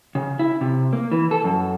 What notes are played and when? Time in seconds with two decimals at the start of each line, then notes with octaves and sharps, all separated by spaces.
0.15 C#3
0.39 E4
0.61 C3
0.93 A#3
1.12 E3
1.31 A4
1.44 F#2